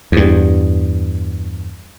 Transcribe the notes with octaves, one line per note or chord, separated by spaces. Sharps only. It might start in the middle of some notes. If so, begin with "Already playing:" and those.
E2 G2